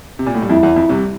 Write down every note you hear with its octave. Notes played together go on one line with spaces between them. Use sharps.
C3
A#2
A2
G2
F2 E4
E2
F2
C2 C3